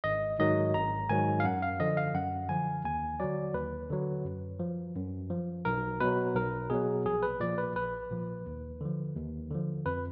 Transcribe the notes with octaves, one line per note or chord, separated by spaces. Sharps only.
G#1 D#5
G#2 D#3 F#3 D#5
G#1 A#5
G#2 D#3 F#3 G#5
F5
F#2 F#5
F5
D3 F3 D#5
F5
F#2 F#5
D3 F3 G#5
D#2 G#5
D3 F#3 D5
D#2 B4
D3 F#3
F#2
F3
F#2
F3
B1 A#4
B2 F#3 B4
B1 A#4
B2 F#3 G#4
A#1 G#4
B4
A#2 F3 D5
B4
A#1 B4
A#2 F3
D#2
D3 F3
D#2
D3 F3
F2 B4